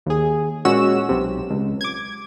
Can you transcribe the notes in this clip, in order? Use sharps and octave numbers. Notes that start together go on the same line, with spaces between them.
D#2 G#4
A#2 G#3 C#4 F#4 E6 E7
B1 C3
C#2
D6 G#6